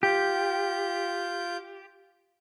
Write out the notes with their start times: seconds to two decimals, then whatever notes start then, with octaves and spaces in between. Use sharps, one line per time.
0.03 F4 G4 G6